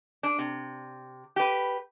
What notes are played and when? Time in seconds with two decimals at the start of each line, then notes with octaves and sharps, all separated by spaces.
0.23 D4
0.39 C3
1.36 G4 B4